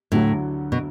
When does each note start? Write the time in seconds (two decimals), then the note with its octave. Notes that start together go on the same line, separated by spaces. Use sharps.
0.12 D2 A2 D3 F#3
0.72 B2